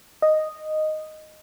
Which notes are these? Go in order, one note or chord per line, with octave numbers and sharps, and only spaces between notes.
D#5